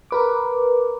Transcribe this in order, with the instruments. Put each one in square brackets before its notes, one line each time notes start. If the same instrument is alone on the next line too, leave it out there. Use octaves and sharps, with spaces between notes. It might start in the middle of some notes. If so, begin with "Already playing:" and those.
[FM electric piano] A#4 B4 D6